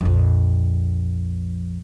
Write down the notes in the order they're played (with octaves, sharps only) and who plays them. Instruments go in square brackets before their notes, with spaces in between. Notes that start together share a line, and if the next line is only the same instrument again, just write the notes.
[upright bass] A#1 F2